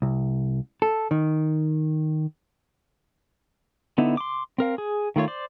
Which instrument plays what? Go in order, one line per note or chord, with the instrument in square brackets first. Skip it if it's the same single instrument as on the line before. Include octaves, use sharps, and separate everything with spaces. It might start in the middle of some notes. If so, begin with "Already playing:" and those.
[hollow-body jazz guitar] C2
A4
D#3
[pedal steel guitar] D3 B3 D#4 E4
C6 D6
C4 A#4 F5
G#4
D#3 A3 F4 C#5
C5 D5